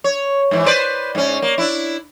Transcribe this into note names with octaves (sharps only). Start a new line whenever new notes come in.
C#5
G#2 E3
B4 C5 D5
G#2 C#4
A#3
D4 E4